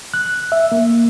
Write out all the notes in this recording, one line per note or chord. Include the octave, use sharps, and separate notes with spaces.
F#6
E5
A#3